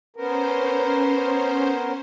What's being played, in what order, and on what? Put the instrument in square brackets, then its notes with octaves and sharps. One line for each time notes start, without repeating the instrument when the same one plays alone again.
[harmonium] B3 A#4 [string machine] C#4 C5